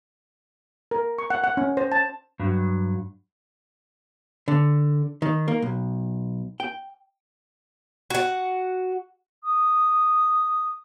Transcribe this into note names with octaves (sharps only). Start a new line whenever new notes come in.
A#4
C#6
F#5
F#5
C#4
C5
A5
G2 F#3
D3
D#3
A#3
B1
G5
F#4 F#5
D#6